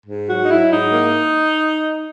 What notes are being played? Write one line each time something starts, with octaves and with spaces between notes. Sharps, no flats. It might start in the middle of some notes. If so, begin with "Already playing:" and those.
G#2
F#3 F#4
D#4
F#3 E4
G#2 D#4
A#3